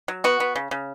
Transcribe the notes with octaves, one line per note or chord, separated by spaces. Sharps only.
F#3
B3 F#4
B3
C#3
C#3